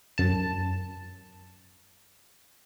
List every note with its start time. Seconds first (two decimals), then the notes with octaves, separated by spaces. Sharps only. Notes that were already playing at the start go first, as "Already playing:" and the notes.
0.18 F#2 A5